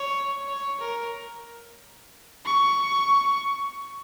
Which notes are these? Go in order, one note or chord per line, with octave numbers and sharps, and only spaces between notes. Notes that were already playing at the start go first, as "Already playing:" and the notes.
Already playing: C#5
C#5
A#4
C#6